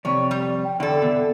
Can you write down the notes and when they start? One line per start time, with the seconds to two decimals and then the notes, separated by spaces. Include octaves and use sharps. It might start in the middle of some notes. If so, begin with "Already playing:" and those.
0.05 F2 C3 C#5 D5
0.31 G3
0.63 G5
0.80 E2 D3 A4 D5
1.02 B2